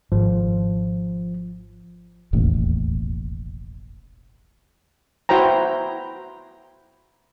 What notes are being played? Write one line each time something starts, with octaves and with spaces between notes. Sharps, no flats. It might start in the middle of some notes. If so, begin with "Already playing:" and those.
G#1 F3
E1 A1 D#2
E4 F#4 C5 G5 A#5